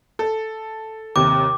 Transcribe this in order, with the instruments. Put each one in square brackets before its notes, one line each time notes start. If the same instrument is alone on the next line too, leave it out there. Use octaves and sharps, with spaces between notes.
[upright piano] A4
[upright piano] D#2 C3 [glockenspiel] D6